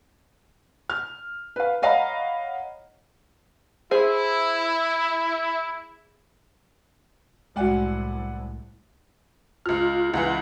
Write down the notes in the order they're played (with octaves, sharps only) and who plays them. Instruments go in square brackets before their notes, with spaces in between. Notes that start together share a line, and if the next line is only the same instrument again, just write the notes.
[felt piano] F6
B4 F5
C#5 D#5 F5 F#5 A#5 B5
[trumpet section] E4 [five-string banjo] G#4 C5
[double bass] C2 A2 [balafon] G#3 F#4 [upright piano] D5 F#5 G#5
[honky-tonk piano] C#2 F6 [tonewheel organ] F4
[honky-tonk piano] C#2 E3 [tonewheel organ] E4 F5 F#5